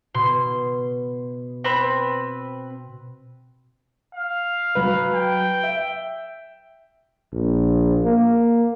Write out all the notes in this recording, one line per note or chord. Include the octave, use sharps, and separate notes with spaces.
B2 C6
C4 B4 B5
F5
F#3 B4
G5
E5
A#1
A#3